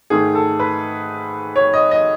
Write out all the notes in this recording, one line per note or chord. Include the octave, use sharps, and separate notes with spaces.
G#2 D#3 A3 G#4
A4
B4
C#5
D#5
D#5